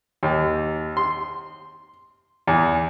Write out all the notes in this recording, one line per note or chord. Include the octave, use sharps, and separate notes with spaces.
D#2
C6
E2